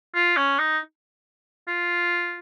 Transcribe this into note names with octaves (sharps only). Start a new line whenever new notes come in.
F4
C#4
D#4
F4